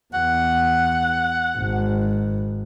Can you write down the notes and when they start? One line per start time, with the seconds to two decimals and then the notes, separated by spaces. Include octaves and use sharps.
0.14 E2 F#5
1.58 G#1